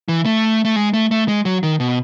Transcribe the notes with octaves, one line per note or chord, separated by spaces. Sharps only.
E3
A3
A3
G#3
A3
A3
G#3
F#3
D#3
B2